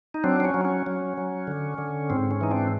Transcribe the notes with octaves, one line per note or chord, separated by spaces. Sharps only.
D#4
F#3 C4 D4
C4
C#4
F#3
C#4
F#3
F#3
D3
D3
G#2 C4
C#4
E3 D#4
C4 D4